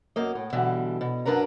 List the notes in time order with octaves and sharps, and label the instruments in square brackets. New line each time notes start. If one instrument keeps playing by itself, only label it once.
[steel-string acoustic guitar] F#2 A#3 D#5
A2
B2 D3 E3 G3
B2
F#2 D4 A#4 B4 A#5